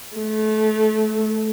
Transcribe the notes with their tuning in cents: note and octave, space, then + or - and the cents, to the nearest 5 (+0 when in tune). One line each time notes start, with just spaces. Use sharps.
A3 -25